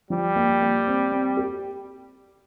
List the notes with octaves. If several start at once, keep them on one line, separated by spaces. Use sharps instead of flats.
F3 G3
A#3
A#3
C4
C4
G4